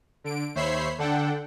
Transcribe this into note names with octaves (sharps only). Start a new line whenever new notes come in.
D3 D7
D#2 C5 C#5 E5 B5 C7
D3 D4 A4 F#5 G5